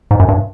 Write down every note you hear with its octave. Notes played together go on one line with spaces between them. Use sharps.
G#2
F#2
G2